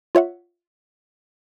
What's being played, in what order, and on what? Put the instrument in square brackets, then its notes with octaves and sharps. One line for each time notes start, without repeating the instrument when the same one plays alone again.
[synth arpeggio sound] F4 C#5 E5 F#5